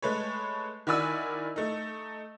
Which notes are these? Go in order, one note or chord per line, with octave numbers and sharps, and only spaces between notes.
G#3 A3 B4 C#5
D#3 E4 F#4 D5 G#5 E6
A3 D#4